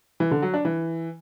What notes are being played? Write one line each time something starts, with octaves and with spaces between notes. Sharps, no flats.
E3
D3
F#3
D4
E3